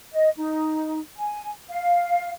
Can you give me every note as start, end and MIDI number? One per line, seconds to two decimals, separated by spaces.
0.13 0.29 75
0.37 0.99 63
1.18 1.50 80
1.70 2.30 77